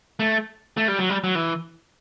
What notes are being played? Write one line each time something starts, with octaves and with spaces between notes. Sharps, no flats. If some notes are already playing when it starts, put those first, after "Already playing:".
A3
A3
G3
F#3
G3
F#3
E3